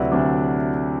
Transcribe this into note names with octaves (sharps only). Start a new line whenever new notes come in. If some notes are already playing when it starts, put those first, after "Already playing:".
Already playing: D2 C3 F#3 E4 F#4 B4 D5
D2 C3 F#3 D4